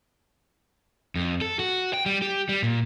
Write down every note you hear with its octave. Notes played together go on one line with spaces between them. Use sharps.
F2
A4
F#4
G5
G3
G4
G3
A#2